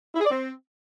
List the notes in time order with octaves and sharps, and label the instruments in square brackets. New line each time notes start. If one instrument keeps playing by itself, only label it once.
[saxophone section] E4
G#4
D5
C4